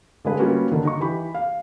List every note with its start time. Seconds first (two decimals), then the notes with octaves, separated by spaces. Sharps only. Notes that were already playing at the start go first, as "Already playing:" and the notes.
0.25 D3 G#3 B4
0.39 G3 A#3 B3 C#4 F4 F#4
0.72 D3 D#3
0.85 D#4 C#6
1.00 E3 G4 B5
1.35 F5